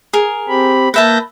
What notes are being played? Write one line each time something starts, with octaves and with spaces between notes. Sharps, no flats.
G#4 A#4
C4 G4 B5
A#3 B4 E5 A5 G6 A#6